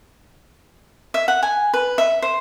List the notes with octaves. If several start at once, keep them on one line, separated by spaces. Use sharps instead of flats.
E5
F#5
G#5
B4
E5
C5